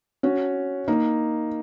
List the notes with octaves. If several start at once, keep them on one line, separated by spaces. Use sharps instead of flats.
C#4 F#4
A#3 D#4